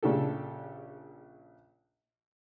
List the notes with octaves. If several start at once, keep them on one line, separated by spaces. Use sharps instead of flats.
A#1 C#3 D4 G4 A4